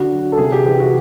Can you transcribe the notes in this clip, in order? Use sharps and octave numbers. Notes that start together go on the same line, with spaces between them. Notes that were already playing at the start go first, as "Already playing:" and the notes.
Already playing: D3 F#4
F#3
A4
C3 G#4
G4
E3 G4
F#4